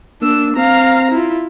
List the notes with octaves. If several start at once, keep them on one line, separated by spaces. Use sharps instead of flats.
A#3 D4 E6
C4 F5 A#5
E4 F4